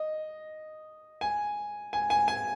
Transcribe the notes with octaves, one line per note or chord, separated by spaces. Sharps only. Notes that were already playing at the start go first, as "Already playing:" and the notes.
Already playing: D#5
G#5
G#5
G#5
G#5